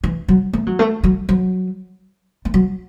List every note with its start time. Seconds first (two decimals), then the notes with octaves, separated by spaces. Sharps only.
0.04 E3
0.28 F#3
0.53 A3
0.67 F#3
0.79 A3
1.04 F#3
1.29 F#3
2.45 A3
2.54 F#3